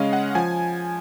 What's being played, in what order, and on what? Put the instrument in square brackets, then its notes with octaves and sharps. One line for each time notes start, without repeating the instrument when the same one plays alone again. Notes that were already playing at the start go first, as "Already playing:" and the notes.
Already playing: [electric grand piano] C#3 G#3 C#4 C#5 D#5 F5
F#5
F3 G#5